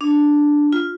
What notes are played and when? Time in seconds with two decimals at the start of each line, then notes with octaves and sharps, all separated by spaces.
0.01 D4
0.73 F4